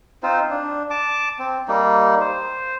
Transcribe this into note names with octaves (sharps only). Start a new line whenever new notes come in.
C4 D#4 F4 C5
D4
A5 D6
C4
G3 A#3 D#4
C5